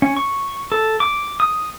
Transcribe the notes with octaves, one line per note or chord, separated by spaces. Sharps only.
C#4
C#6
A4
D6
D#6